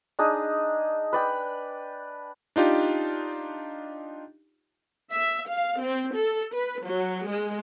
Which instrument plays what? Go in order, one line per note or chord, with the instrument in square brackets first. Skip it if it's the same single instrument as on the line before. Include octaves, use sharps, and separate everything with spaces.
[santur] D4 D#4 G#4
B4 D5 G5
[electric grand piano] D4 D#4 F4 G4
[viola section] E5
F5
C4
A4
B4
F#3
G#3